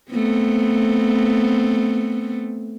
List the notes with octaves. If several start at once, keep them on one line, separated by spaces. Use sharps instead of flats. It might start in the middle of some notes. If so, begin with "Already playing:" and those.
A3 B3 C4